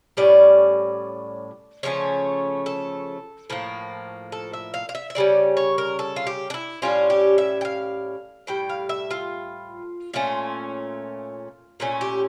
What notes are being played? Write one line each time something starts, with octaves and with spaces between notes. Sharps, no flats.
A2 G3 C#4 D5
C#3 F3 A3 C#4 C#5
A4
A2 F3 A#3
A4
E5
F5
F5
E5
E5
C#3 G3 C#4 D5
C#5
A#4
A4
F4
G4
D4
E4
A2 G3 C#4 F4
G4
E5
G5
F5
A2 G3 G5
F5
E5
F4
A#2 A3 C#4 F4
A#2 A3 C#4
G4